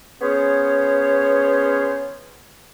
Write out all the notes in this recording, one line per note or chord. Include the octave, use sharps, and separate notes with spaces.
B3 C#4 G#4 C5 C#5